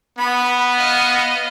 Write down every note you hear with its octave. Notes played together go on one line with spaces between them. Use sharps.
B3 B5
D#5 F5